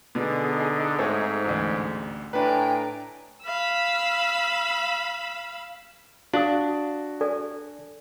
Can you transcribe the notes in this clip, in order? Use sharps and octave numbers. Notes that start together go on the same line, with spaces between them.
B2 D3 D#4 G#4
G#2 A3 C4 C#5
A1 D2
A2 D4 B4 G5 G#5 A#5
F5 B5 E6
D4 F#4 F5 D#6
A4 D5 G#5